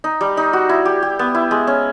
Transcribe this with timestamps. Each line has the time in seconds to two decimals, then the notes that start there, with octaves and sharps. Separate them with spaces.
0.04 D#4
0.21 G3
0.37 D#4
0.53 F#4
0.69 E4
0.85 G4
1.02 G4
1.19 B3
1.35 E4
1.51 G#3
1.67 C#4